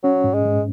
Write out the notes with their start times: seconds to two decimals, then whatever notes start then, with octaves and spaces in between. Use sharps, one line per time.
0.03 F#3 C#4
0.24 G#2
0.34 G#3
0.45 G#2